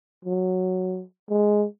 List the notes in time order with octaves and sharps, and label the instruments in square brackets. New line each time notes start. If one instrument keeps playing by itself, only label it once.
[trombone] F#3
G#3